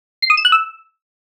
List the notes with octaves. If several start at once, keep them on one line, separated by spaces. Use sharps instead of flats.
C7
D#6
E7
F#6
E6